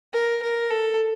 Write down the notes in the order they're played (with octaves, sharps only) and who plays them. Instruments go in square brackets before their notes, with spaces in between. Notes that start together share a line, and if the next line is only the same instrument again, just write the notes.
[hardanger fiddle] A#4
A#4
A4